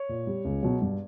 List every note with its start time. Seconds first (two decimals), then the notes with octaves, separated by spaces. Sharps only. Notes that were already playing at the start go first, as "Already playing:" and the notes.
Already playing: C#5
0.09 A#2
0.27 G3
0.45 C#2
0.63 B2 F#3
0.81 G2